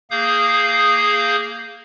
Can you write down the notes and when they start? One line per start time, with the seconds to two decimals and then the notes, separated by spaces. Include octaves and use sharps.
0.10 A#3 G#4 F5 D#6 G6